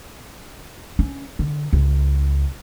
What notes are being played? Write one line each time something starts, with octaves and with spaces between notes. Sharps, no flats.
C#4
D3
C#2